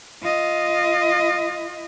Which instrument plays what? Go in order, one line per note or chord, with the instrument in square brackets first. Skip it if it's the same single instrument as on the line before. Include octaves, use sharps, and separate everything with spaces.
[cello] F4 D#5